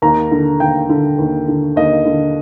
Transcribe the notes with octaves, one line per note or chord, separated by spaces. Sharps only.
D#2 A#5
D3
D#2 G5
D3
D#2
D3
D#2 D#5
D3